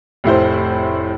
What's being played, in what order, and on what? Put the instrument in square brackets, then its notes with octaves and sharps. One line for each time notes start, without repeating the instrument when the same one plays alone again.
[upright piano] F1 A2 E4 C5